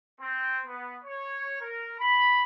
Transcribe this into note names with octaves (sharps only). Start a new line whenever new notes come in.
C4
B3
C#5
A#4
B5